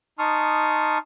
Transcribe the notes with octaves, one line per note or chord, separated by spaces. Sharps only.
D#4 A5 C6 C#6 D#6 F6